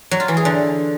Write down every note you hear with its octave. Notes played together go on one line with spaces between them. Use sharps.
F#3
F4
E3
G#4
D3